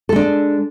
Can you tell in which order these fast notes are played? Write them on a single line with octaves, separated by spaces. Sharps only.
A4 G#3 D4